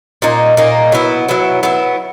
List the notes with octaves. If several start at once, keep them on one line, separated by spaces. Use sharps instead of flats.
A#2 A#3 D#4
A#2 A#3 D#4
F#3 B3 E4
F#3 B3 E4
F#3 B3 E4